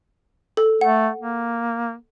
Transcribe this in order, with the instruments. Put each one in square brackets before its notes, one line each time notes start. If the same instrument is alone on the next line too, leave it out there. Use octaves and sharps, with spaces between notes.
[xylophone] A4
[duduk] A3 [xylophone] F#5
[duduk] A#3